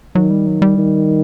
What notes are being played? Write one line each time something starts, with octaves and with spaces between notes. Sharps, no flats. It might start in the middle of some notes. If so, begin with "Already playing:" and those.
D#3 F#3
G3
F#3
G3
D#3